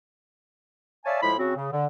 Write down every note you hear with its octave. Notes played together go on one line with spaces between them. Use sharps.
C#5 D5 E5 F5 G#5 A5
A2 F3 G#3 E4 B5
C#3 C4 F#4
C#3
D3